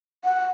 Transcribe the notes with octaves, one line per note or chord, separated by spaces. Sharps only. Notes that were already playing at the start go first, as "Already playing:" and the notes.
F#5